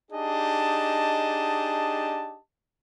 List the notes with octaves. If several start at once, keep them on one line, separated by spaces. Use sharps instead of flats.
D4 D#4 G4 G#4 D#5 A5